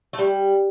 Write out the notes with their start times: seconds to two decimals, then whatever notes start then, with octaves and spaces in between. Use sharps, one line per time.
0.13 A3
0.18 G3